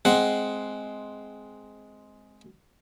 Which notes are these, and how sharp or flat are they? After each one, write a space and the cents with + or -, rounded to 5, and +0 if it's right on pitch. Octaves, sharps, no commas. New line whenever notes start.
G#3 +10 C4 +0 F#5 +0